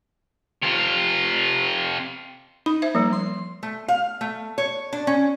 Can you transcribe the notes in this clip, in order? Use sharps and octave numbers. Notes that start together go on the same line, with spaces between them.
C3 F4
D#4 B5
C5 E5
F3 G3 A#3
C6
A3
F5
A3
C#5
D4
C#4